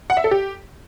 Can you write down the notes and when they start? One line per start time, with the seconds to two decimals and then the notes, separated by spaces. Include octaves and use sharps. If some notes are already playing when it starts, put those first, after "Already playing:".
0.10 F#5
0.17 E5
0.24 A4
0.31 G4